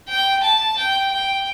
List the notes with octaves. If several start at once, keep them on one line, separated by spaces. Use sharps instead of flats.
G5
A5
G5
G5